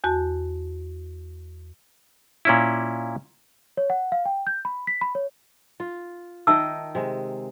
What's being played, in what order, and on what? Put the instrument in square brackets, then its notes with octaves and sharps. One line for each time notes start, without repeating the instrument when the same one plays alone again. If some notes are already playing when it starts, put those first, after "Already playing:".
[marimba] E2 F#4 A5
[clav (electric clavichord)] A#2 C#4 E4
[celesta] C#5
F#5
F5
G5
G6
B5
B6
B5
C#5
[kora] F4
[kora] D#3 D#5 G5 [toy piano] E5 A5 E6
[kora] C3 G#3